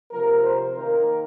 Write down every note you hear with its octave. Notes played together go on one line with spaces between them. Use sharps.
C3 F3 A#3 A#4
C5
D#3 A#3 A#4